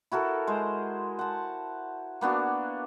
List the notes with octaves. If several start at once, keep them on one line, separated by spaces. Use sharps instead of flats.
E4 F#4 A4 A#4
G#3 C5
F#5 A5
A#3 B3 D4 F#4